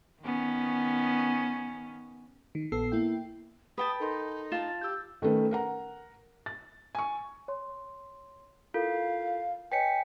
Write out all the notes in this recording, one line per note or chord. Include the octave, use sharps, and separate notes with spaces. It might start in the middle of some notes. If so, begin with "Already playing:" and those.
D#3 B3 C#4
D#3
A#1 B3 A4 E6 C7
A#3 E4 G5
B4 G5 A5 D#6
D#4 A4 A#4 C6
F4 A5 E7
A6
G4 E6 G6
D#3 A3 C#4 A4 B4
A#4 F#5 A#5
A6
G#5 C#6
C#5 C6
E4 F4 A4 A#4 F5
B4 C#5 D#5 G5 G#5 B6 C#7